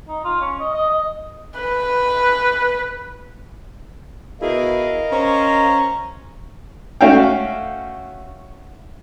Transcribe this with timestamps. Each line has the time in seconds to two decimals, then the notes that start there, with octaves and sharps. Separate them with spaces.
0.08 D#4
0.24 F4
0.41 C#4
0.60 D#5
0.74 D#5
0.89 D#5
1.59 B4
4.41 B2 E4 G#4 A#4 D#5 F5
5.11 C#4 C5 C#5 A#5
7.01 A3 C#4 F#4 E5 F5 G5